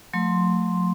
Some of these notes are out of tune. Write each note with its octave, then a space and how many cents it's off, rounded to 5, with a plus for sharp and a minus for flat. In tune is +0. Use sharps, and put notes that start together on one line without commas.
F#3 -45 A3 +15 C6 +0